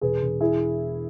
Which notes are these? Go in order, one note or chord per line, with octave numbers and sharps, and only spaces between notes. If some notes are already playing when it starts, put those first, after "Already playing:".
E1 G#4 B4
E1
E4 G#4